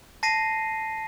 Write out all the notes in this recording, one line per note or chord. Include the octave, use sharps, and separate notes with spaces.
A5 A#6 C7 D#7